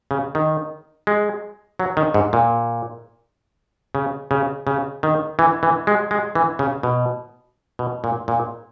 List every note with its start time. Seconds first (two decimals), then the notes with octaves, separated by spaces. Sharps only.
0.11 C#3
0.35 D#3
1.07 G#3
1.79 F#3
1.97 D#3
2.14 G#2
2.33 A#2
3.95 C#3
4.31 C#3
4.67 C#3
5.03 D#3
5.39 E3
5.63 E3
5.87 G#3
6.11 G#3
6.35 E3
6.59 C#3
6.83 B2
7.79 B2
8.04 A#2
8.28 A#2